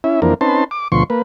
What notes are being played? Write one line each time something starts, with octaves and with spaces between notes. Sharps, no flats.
C#4 E4 E5
F2 E3 A#3 C4 D4 A#4
C4 C#4 D#4 B4 A5 C6
D6
D2 B2 F3 C6 C#6
A#3 B4